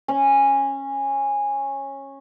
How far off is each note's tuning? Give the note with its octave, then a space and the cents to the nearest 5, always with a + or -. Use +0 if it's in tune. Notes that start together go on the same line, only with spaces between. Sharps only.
C#4 -15